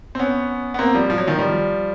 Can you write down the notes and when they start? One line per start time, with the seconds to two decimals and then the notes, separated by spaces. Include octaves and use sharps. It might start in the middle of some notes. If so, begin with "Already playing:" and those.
0.15 C4
0.19 B3 C#4
0.74 B3
0.79 A#3 C4
0.94 F3 G3
1.10 F3
1.18 F#3
1.27 D#3 F3
1.38 F3 G3